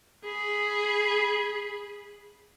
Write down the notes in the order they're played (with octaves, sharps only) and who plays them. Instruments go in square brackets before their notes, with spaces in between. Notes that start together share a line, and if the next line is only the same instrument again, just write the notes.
[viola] G#4 B5